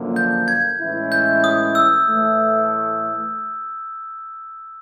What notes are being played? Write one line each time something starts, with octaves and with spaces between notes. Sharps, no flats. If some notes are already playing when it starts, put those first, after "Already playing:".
Already playing: F#2 D3 F3 A#3
G6
G#6
A2 E3 G#3 C#4 E4
G6
D#6
E6
A2 E3 A3